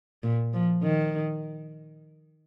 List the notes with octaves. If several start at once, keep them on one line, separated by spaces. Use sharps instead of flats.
A#2
F3
D#3